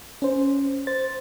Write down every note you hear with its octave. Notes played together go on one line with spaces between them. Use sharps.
C#4 C5
C5 A6